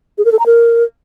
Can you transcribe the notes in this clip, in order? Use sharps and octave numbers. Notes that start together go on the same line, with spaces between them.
G#4
A#4
A4
A#5
A#4